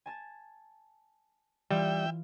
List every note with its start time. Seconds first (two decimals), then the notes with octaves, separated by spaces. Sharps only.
0.06 G#5 A5 A6
1.71 E3 G3 F4 E5 G5